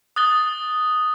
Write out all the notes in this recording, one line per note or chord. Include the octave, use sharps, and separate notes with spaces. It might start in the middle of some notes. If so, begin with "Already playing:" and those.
D#6 F#6 A6 G7